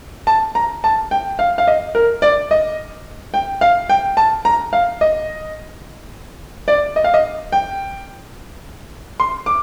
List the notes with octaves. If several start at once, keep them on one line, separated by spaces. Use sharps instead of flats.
A5
A#5
A5
G5
F5
F5
D#5
A#4
D5
D#5
G5
F5
G5
A5
A#5
F5
D#5
D5
D#5
F5
D#5
G5
C6
D6